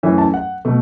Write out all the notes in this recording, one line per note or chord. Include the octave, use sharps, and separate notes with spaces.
F#2 E3 A3 C#4 E5
A5
F#5
B2 A3